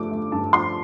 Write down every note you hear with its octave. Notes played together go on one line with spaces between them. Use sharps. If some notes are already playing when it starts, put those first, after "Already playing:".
Already playing: G2 F3 A3 D6
A3
G2 A5
F3 C6